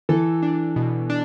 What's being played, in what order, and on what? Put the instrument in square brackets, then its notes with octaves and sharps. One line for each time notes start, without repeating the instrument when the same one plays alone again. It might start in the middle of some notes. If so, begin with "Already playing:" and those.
[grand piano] E3 [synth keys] A4
[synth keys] D4
B2
D4